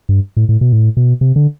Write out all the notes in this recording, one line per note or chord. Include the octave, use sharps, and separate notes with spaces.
G2
A2
A2
B2
A2
B2
C3
D3